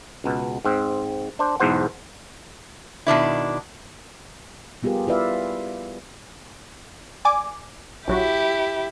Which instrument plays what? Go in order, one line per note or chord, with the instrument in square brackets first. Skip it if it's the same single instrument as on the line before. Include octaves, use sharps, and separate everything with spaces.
[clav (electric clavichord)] C#2 B2
G#2 C4
D4 C5
B1 E2 G#2 C5 F#5
[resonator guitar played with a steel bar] B2 D#3 D4 E4
[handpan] G3 B3 F4 G4 G#4 A#4
E4 F4 B4 D5 E5 F5
[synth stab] D5 G#5 D6
[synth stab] A#1 F#3 F#4 [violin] E4 G4